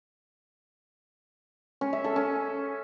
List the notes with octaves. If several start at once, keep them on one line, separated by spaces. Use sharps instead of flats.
C#4
E5
A4
C#4